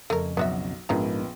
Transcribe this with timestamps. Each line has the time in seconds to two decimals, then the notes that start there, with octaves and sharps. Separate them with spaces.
0.10 F2 C#3 A3 A#4
0.37 B1 F#3 B3 F#4 E5
0.89 A#1 G#2 C#3 A#3 B3 D4 A#5